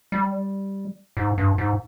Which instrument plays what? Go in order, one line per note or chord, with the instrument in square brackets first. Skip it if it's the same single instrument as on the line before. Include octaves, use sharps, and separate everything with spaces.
[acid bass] G3
G#2
G2
G#2